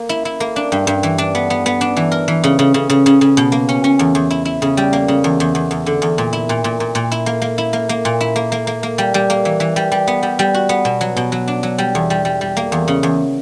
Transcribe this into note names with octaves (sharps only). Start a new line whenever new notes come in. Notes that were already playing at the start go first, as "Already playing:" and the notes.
Already playing: A#3
E4
E4
A#3
D4
G2
G2
E3
D4
B3
B3
B3
D4
E3
A#4
E3
C#3
C#3
C#3
C#3
C#3
C#3
B2
A#3
C#4
C#4
E2
E2
E4
E4
C#3
G3
A#3
C#3
E2
E2
E2
E2
D3
E2
A#2
E4
A#2
A#2
A#2
A#2
E4
A#3
A#3
E4
A#3
A#3
A#2
E4
A#3
A#3
A#3
A#3
G3
G3
A#3
E3
E3
G3
G3
B3
G3
G3
F#4
B3
B2
F#3
B2
F#3
D4
F#3
G3
E2
G3
G3
G3
A#3
E2
C#3
E2